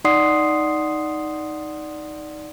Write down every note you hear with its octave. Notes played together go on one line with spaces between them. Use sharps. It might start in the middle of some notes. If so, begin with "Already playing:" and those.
D#4 D5 F#5 C6 D#6 C7